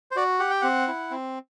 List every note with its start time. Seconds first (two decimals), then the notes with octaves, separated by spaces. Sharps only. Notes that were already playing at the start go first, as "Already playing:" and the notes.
0.11 C5
0.16 F#4 D5
0.40 G4 F#5
0.51 G5
0.61 C4 F#5
0.88 E4
1.11 C4